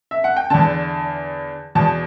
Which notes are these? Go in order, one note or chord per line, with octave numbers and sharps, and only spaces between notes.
E5
F#5
G5
E2 D3 A5
E2 B2 A5